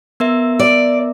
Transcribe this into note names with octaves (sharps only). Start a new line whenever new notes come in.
B3 A#4 E5
D5